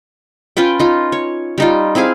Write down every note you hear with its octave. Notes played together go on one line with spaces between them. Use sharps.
C#4 F4 B4 G5
D#4 F4
C#5
G3 D#4 F4
C4 E4 G#4 F5